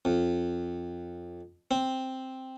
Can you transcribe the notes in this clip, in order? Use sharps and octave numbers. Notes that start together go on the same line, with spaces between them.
F2
C4